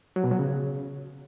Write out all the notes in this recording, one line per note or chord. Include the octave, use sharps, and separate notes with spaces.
F#3
B2
F#3
C#3